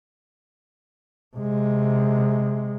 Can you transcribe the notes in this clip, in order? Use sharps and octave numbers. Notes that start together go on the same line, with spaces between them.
C3 G#3